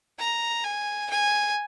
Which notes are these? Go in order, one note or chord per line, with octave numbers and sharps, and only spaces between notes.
A#5
G#5
G#5